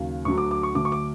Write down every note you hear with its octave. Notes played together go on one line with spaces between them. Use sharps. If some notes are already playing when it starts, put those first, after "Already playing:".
Already playing: D#2 C#3 F#3
D2 D3 F#3 C#6
D6
D6
C#6
D2 D3 F#3 D6
C#6
D6